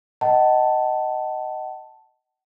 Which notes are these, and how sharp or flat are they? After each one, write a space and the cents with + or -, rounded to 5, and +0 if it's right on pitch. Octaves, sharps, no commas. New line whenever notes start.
D#5 +0 F#5 +30 A5 +0